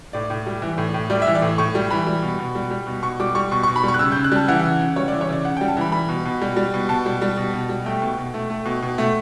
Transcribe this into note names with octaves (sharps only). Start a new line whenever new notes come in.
A2 D5
A2
G3
E3
A2
A2
G3 D5
E3 E5
D5
A2
A2 C#6
G3
E3 B5
G3
B2
B2
G3
G3
B2
B2 C#6
G3 D6
G3 C#6
B2 C#6
B2 C#6
B5
G3
C#6
F#6
C#3 E6
C#3 G6
F#6
G3 A5
E3 F#5
C#3
C#3
G3 C#5
E3 D5
C#5
C#3 D5
C#3 F#5
G3 G5
A5
E3 B5
G3 B5
B2
B2
G3
G3
B2
B2 A5
G3
G3
B2
B2
G3
A3 G5
B2
B2
A3
A3
B2
B2
A3